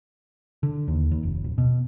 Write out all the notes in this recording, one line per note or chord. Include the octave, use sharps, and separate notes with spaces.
D3
D#2
D#2
F1
D1
B2